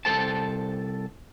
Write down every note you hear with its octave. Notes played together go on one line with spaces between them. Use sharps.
C2 F3 A4 C5 A5